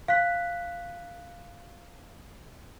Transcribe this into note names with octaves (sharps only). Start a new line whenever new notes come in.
F5 F#6 B6